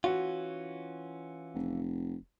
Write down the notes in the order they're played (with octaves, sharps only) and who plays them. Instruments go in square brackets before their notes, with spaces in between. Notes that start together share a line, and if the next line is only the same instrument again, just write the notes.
[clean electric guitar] E3 C#4 F4 [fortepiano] F#4
[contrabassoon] F1